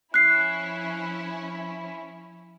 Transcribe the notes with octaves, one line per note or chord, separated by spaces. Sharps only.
F3 C#4 E4 F#6 C7